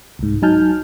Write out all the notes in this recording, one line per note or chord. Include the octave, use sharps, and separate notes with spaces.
C2 G#2
F#3 D#4 G#5 A5 F6 G6